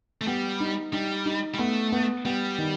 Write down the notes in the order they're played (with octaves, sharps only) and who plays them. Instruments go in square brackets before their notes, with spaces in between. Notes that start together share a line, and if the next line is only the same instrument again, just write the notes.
[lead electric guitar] A3
[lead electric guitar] G3 [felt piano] B3
[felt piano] D#4
[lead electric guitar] G3 [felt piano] D#4
[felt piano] D#4
[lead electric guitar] G3
[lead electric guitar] A3 [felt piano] B3
[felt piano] B3
[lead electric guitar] G3 [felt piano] B3
[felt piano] D#3